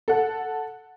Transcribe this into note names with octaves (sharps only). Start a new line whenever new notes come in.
A4 F#5